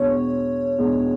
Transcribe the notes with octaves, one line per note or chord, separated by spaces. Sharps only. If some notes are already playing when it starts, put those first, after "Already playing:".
Already playing: E2 B2 G#3 D4 C#5
E2 B2 G#3 D4